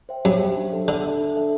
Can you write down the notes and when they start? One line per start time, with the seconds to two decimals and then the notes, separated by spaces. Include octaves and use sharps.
0.09 C5 E5 G5
0.25 F#2 G4
0.40 C5 E5 G5
0.57 D4
0.73 A4 E5 A5
0.88 D3 D4
1.04 A4 E5 A5
1.20 D4
1.35 A4 E5 A5